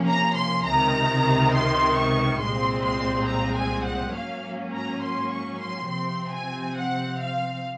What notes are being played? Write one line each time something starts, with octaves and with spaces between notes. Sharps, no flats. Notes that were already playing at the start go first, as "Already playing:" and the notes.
Already playing: C3 F3 A#3 C#4
A#5
C6
C#2 C3 D#3 A#5
C6
C#6
C2 A#2 G#3 C4 C6
C6
A#5
G#5
F#5
G#2 F#3 A#3 C#4 F5
A#5
C6
C#6
C6
C3 F3 C4 C6
G#5
F#5
F5